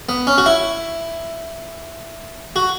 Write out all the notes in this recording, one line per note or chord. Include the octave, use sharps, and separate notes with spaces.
B3
C#4
F#4
E4
F#4